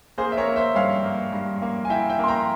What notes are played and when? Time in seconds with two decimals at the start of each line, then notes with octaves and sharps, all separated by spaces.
0.18 A#3 G#4 C5
0.32 E5
0.37 A#4 C#5
0.48 A#3
0.56 C5 E5
0.75 G2 C#5 F5
1.04 A#3
1.33 G2
1.62 A#3
1.85 G#5
1.90 E4 E5 G5
2.09 E5 G5
2.19 A#3 C6
2.28 G5 A#5